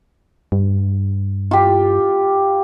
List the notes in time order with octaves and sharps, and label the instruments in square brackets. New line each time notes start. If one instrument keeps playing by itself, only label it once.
[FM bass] G2
[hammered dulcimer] F4 G4